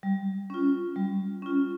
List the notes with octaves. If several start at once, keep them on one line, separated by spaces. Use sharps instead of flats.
G3
C#4 F4
G3
C#4 F4